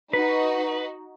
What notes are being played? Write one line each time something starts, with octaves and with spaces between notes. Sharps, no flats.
D#4 F#4 B4